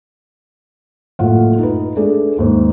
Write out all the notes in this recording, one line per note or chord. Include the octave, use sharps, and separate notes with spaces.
F#1 A2 F4 F#5
D#4 B4
A3 D4 G#4
D#2 G#2